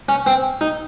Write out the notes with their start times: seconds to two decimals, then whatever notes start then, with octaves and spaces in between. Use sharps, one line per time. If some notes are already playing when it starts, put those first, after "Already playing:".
0.09 C#4
0.26 C4
0.61 D#4